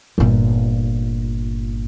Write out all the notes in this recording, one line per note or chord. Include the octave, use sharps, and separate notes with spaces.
G1 A#2